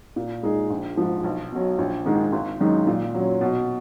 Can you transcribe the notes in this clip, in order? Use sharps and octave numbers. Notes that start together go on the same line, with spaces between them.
A#2
G#3 D#4 G#4
A#1
G#2 F3
B1
B2 F#3
A#1
G#2 D#3 G#3 D#4
G#1
F#2 D#3 G#3 D#4
A#2
F#3 C#4
B2